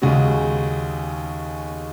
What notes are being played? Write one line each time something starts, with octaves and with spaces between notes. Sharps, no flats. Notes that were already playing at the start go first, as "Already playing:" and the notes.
D#2 C#3 G#3 C#4 F#4